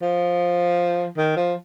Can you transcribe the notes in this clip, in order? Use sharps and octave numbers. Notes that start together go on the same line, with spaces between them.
F3
D#3
F3